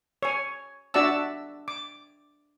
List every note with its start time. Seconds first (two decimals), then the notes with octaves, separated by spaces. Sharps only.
0.23 C#5 G#5
0.94 D4 F#4 D5 E5 A5 E6
1.68 D6